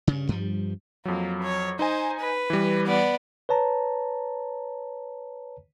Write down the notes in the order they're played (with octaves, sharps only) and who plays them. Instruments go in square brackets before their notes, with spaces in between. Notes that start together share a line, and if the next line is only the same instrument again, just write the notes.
[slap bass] G2 C#3
G2 F3 G3
[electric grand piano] F2 F#3 [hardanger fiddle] A#3
[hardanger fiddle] C#5
[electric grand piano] D#4 D#5 G#5 [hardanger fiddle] C5
[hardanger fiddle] B4
[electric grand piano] E3 G3
[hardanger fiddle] B3 D5
[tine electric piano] B4 C#5 A5 A#5